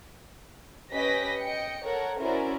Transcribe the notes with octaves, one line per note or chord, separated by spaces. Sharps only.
C#4 G4 B4 D#5 A#6 B6
D#5 G5 C#7
A4 A#4 C#5 F#5
C#4 E4 F#4 A#4 C5 D5